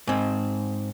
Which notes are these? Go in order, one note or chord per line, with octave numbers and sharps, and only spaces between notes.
G#2 C4